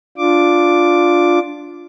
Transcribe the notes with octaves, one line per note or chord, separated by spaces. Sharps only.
D4 F4 D6